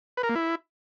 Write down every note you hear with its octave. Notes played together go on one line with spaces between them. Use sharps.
B4
A#4
A#3
E4